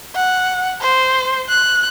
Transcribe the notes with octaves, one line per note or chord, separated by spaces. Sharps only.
F#5
C5
F#6